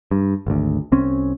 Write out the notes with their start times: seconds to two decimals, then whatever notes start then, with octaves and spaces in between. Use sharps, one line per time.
0.11 G2
0.47 G#1 D2
0.92 C2 C4 C#4